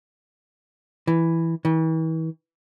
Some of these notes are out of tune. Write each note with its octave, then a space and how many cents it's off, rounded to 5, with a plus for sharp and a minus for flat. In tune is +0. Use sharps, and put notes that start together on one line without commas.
E3 +0
E3 -40